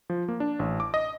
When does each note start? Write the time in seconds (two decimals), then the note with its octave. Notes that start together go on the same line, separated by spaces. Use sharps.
0.10 F3
0.28 A#3
0.40 D4
0.59 A1
0.80 D6
0.94 D#5